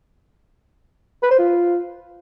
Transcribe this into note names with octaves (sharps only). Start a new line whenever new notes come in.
B4
C5
F4